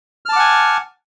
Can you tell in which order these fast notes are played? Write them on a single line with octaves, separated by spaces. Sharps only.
F6 A5 D6 F#5 G#5